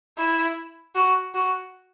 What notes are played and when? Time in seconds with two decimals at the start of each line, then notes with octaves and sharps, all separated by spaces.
0.18 E4
0.95 F#4
1.34 F#4